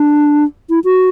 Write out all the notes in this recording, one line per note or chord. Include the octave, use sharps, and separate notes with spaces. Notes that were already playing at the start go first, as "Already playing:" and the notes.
Already playing: D4
E4
F#4